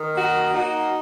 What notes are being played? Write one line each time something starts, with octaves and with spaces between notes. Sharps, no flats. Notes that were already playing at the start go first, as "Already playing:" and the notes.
Already playing: D#3
A#3 F#4
D#4 F#4